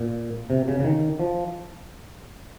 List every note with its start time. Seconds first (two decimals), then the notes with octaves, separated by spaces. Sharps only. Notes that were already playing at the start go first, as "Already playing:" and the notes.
Already playing: A#2
0.50 C3
0.68 C#3
0.80 C#3
0.85 D#3
1.20 F3